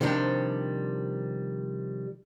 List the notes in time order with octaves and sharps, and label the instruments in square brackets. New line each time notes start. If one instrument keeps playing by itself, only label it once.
[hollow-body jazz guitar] C3 D#3 F3 G3 D4